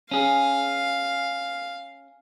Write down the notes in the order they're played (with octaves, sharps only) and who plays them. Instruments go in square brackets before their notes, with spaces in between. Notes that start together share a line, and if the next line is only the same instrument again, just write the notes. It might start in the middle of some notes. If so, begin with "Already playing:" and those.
[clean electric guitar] C#4 G#4 [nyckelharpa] F5